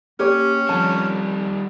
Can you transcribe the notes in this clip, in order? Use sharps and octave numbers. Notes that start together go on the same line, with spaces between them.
A#3 C#4 G4 C#5
F2 D#3 G3 A5